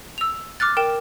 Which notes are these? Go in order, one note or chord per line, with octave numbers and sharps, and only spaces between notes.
E6 F7
D6 F6 F#6 A6
A#4 G5 E7